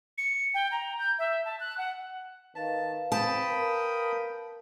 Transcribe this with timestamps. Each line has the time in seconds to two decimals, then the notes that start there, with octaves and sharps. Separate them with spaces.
0.18 C#7
0.54 G5
0.71 A#5
0.99 G6
1.19 E5
1.45 A5
1.60 F#6
1.78 F#5
2.55 D#3 B4 F5 A5
3.12 C4 G5 A5 B5 D#6
3.50 A#4